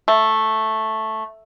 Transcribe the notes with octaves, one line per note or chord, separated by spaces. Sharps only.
A3